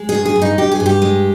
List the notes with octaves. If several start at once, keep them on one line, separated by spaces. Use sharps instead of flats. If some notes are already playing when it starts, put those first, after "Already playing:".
Already playing: G#3
G#4
G2
G#4
G2
D#4
G2 G4
G#4
G2
G4
G#3